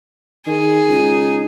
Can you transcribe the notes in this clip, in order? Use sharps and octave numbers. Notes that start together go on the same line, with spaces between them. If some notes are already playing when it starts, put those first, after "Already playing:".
D#3 G#4
C#2 D#4